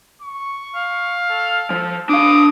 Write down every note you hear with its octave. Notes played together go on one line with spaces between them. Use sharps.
C#6
F5
A4
F3 A4
D4 F5 D6 D#6